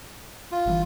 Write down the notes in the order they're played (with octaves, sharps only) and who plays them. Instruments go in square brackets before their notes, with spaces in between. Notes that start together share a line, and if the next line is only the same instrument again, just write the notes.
[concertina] F4
[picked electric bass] G1 A#2 E3